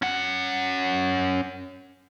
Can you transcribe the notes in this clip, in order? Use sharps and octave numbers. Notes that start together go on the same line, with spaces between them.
C#4 F#5